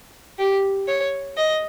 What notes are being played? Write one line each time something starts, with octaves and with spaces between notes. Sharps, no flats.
G4
C#5
D#5